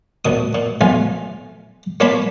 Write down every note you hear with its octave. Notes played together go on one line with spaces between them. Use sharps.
D2 A#2 D#6
A#2
B1 A3 F4 G#5
A#3 F4 C#5 D5 A5 B5